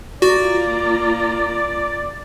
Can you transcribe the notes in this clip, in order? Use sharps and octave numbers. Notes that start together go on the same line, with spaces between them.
A#3 F4 F#4 D5 A#5